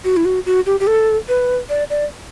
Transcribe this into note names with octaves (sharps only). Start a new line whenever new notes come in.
F#4
E4
F#4
F#4
G4
G4
A4
B4
D5
D5